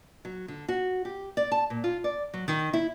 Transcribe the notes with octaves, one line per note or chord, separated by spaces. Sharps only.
F#3
D3
F#4
G4
D5
A5
A#2
F4
D5
F#3
D#3
E4